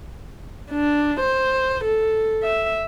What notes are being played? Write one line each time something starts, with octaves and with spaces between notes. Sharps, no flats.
D4
C5
A4
E5